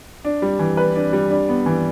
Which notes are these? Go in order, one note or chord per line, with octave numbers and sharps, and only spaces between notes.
D4
G3
E3
B4
D4
G3
D4
B3
E3